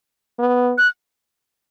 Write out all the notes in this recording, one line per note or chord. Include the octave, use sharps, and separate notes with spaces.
B3
F#6